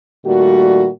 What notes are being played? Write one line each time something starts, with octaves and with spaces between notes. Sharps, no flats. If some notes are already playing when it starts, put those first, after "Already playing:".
A#2 D#3 G3 A3 F#4